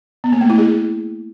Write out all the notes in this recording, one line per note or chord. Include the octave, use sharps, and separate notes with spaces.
B3
A#3
A3
E4
G#4